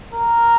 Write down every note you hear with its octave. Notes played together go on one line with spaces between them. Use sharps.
A#4